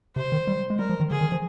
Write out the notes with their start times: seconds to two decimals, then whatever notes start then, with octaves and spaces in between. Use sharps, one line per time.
0.16 C3 C5
0.32 D#3
0.47 G3
0.70 G#3
0.79 G3 A#4
0.90 F3
1.00 D#3
1.11 D3 G#4
1.21 D#3
1.32 F3